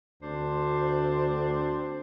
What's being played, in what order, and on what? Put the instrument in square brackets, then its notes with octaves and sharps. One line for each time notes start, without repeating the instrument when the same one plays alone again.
[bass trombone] D2 [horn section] C4 D4 C5